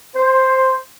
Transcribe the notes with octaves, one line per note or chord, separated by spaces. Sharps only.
C5